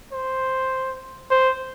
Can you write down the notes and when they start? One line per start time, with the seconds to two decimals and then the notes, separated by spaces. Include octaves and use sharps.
0.13 C5
1.31 C5